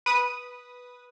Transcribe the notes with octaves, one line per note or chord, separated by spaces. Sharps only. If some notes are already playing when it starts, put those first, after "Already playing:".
B4 D#6